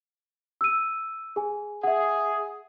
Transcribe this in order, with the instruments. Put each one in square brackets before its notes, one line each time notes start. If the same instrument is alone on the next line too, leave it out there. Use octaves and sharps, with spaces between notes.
[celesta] E6 D#7
G#4 G#5
[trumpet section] G#4 [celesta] E5 F#5